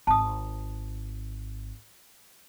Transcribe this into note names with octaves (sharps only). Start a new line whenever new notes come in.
G#1 A5 D#6